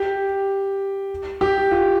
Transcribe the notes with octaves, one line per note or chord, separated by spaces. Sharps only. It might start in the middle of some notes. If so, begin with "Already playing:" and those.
Already playing: G4
G4
F4